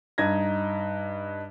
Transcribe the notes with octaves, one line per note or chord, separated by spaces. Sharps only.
G2 D#4 G#6 A#6